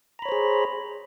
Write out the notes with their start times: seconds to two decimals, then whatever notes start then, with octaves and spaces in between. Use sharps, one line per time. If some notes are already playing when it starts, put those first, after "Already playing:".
0.19 A#5
0.22 B5
0.25 C#5
0.29 C5
0.32 G#4